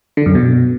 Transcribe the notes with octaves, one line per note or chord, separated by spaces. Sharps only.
D3
F#2
B2